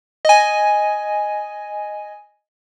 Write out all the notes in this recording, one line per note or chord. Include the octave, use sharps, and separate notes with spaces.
D#5 G#5